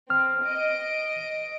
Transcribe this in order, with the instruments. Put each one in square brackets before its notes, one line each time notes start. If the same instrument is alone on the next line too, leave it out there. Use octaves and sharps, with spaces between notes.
[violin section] C4 [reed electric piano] F6
[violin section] D#5 D7